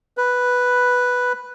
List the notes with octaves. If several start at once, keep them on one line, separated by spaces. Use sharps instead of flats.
B4